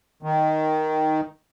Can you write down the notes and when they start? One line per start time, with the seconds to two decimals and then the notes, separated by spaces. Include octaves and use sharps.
0.23 D#3